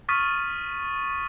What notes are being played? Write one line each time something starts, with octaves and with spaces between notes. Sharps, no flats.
C#6 D#6 F6 A6 B6 D#7